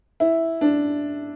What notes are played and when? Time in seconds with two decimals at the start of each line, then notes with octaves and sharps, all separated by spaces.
0.20 E4
0.61 D4